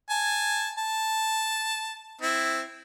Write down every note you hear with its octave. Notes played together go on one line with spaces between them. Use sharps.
G#5 A5
A5
C4 E4